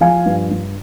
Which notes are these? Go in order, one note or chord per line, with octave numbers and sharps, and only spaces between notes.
F3 F5 G#5
G2
G2